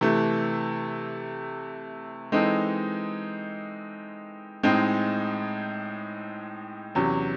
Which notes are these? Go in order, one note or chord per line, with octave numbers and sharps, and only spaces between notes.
C3 E3 A3
E3 G#3 C4 D#4 A4
A2 G#3 C4 D#4
E2 C3 F#3 C#4